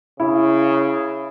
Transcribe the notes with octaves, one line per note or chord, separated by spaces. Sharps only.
C#3 E4